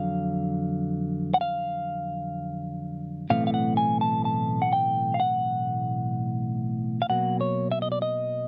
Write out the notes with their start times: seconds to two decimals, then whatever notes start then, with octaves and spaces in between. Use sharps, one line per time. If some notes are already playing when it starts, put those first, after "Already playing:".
Already playing: F2 D3 F#3 F5
1.34 F#5
1.41 F5
3.30 B1 A2 E3 A3 C4 F5
3.47 F5
3.54 F#5
3.77 G#5
4.01 A5
4.25 A5
4.62 F#5
4.73 G5
5.14 F5
5.20 F#5
7.02 F5
7.09 B1 B2 F#3 A#3 F#5
7.41 C#5
7.72 E5
7.82 D#5
7.92 D5
8.02 D#5